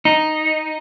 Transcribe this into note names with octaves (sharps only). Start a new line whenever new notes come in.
D#4